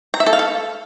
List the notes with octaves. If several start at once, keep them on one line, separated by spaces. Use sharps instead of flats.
A#5
E5
A4
F5
A4